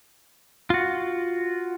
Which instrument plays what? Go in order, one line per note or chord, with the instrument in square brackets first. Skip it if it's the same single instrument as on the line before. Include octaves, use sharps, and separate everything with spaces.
[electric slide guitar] F4 F#4